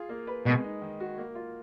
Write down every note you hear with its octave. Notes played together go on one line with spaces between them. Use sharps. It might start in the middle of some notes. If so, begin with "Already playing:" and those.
Already playing: F4 G#4
A#3
B4
B2 G#3
D#4
D#3
F#4
A#3
F4